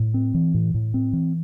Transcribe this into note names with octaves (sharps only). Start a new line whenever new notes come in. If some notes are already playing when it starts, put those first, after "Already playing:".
Already playing: A2
C4
E3
A2
A2
C4
E3